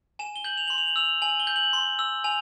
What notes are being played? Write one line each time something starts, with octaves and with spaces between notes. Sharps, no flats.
G#5 E7
G7
G6 F#7
F7
C6 F#7
F7
F#7
E6 F7
G#5 F#7
G7
G6
F#7
C6
E6
G#5 F7